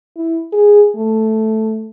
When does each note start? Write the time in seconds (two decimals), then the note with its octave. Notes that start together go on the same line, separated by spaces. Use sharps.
0.16 E4
0.53 G#4
0.96 A3